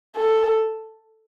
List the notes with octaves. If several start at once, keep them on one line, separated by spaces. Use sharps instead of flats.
A4